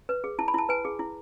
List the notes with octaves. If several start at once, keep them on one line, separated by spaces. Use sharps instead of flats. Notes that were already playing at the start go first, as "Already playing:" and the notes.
B4
G#4
E4 A5
B5
E4 A5
B4 G#5
G#4
E4